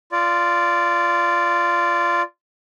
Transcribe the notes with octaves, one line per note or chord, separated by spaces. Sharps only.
F4 D5